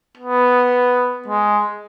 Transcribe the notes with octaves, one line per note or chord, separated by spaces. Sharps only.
B3
G#3